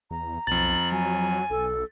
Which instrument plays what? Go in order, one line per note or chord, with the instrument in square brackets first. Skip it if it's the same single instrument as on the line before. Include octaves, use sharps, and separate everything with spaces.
[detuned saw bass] E2 [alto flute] A#5
[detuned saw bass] B1 [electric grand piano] F2 A6 [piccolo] F#7
[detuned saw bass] F#3 [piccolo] G#5
[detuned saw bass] B1 [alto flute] A4